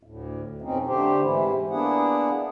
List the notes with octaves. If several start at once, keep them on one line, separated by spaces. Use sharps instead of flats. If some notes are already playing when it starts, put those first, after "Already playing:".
D2 A2
F2 B2 F3 C4 C#4 D#4
D3 A3 G4 C5
G#2 C3 E3 E4
A#3 B3 D4 E4 G#4 F#5